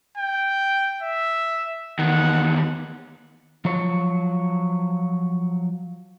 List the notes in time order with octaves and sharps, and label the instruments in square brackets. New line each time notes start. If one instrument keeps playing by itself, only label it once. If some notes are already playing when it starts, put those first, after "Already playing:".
[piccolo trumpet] G5
E5
[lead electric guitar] E2 D#3 [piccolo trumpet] F#5
[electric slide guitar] F3 F#3 C#5